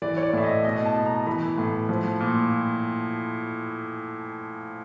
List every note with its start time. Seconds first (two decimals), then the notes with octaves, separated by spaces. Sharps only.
0.02 E3 D5
0.17 C#5
0.23 D5
0.33 A2 E5
0.44 D#5
0.65 B2 D#5
0.86 A5
0.95 B2
1.06 A#5
1.27 E3 B5
1.58 A2
1.89 F3
2.20 A#2